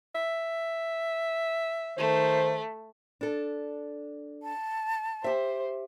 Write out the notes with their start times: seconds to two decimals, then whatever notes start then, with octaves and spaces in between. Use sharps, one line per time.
0.15 E5
1.98 D#3 A3 C5
3.21 D4 A4
4.43 A5
5.24 G4 C5 E5